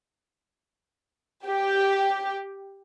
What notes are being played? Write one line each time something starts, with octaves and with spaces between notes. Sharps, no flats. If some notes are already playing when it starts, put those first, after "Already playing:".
G4